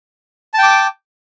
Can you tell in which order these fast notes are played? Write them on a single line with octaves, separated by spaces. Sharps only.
A5 G5 D6